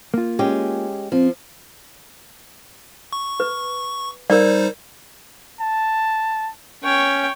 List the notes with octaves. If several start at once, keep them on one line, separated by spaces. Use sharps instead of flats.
A#3 F4
G#3 C#4 G4
F3 C4
C#6
B4
G3 D#4 A#4 C5 D5
A5
C#4 C#5 G5